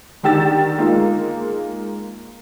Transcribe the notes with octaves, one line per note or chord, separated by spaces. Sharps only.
D3 D#3 G4 E6 A6
G#3 A#3 D#4 F4